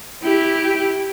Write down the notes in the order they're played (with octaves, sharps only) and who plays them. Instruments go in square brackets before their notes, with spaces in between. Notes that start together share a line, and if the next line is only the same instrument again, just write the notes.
[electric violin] E4 G4